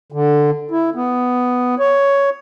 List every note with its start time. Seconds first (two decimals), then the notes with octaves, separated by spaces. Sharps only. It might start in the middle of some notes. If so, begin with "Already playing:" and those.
0.12 D3
0.71 E4
0.95 B3
1.79 C#5